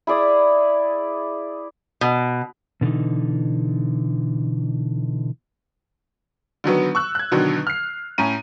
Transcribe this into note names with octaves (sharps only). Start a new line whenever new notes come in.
E4 G#4 D5 D#6
B2
B2 D3 E3 D#4
D3 D#3 F#3 B3
C#6 E6 F#6
F#6 G#6
B2 D3 D#3 F#3
F6 C7
A2 C#4 A#5 D#7